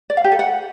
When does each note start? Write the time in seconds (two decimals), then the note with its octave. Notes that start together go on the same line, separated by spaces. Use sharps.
0.10 D5
0.17 F5
0.24 G4
0.32 A4
0.39 F#5